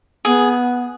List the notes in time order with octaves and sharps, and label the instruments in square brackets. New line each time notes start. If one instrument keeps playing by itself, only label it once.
[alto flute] B3 [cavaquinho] G#4